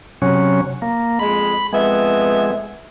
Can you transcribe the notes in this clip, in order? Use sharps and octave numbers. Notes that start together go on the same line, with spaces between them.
C3 F#3 C#4
A#3
F2 G#3 B5
F2 G#3 B3 E5